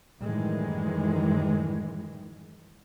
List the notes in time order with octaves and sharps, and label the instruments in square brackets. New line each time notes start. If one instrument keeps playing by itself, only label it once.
[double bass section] F#2 A2 D#3 E3 G3 G#3